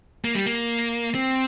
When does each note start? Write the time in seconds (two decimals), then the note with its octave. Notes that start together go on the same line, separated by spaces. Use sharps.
0.24 A#3
0.35 G3
0.46 A#3
1.15 C4